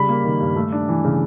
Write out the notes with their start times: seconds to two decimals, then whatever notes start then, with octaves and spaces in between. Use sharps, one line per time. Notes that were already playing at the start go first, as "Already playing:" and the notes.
Already playing: C#3 G3 B5
0.09 A#3
0.24 D#3
0.41 G2
0.56 A3
0.72 D4
0.89 E3
1.05 C#3